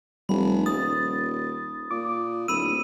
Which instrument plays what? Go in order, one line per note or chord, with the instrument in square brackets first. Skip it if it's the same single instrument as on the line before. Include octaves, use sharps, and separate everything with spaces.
[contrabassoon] F1 [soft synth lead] G3 [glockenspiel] B5
[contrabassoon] D#1 [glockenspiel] D#6 [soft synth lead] A6
[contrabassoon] A#2 [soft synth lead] D6
[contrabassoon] D1 [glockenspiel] B5 D#7 [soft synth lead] E6